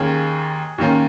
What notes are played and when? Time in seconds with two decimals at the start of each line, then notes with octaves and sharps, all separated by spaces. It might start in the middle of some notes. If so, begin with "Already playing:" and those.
Already playing: D#2 D#3 A#3 C#4 G#4
0.78 D#2 D#3 A#3 C#4